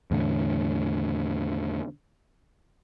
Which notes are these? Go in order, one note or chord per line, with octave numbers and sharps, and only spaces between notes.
E2 A2 D3